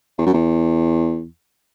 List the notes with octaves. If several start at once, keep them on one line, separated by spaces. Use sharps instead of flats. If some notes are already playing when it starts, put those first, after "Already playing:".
E2
F#2
E2